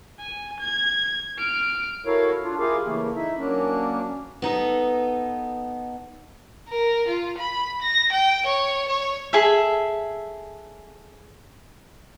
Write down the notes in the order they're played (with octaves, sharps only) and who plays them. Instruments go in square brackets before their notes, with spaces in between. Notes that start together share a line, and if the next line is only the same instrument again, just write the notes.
[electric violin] G#5
G#6
F6 D7
[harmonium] E4 F#4 A4 A#4 C#5 F5
D4 F4
E4 F4 G4 G#4 A#4 F5
C#3 E3 A3 A#3
D#4 E4 E5
F#3 A#3 C#4 D4
[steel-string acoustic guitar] B3 D#4 A4
[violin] A#4
F4
B5
A#6
G5
C#5
C#5
[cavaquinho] G#4 A4 E5